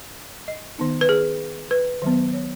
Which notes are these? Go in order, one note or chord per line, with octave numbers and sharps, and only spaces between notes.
D#5
D#3 B3 D#4
B4
G#4
B4
D#3 F#3 B3
C#5